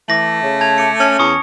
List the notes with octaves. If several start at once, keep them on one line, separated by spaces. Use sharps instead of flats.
E3 A3 D6 A#6 F#7
C#3
A5 G#6 F7
D6 C#7
C#4
E2 C#6 D#6 C#7